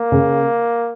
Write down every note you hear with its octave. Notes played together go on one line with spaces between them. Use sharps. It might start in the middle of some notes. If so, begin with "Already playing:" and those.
Already playing: A#3
C#3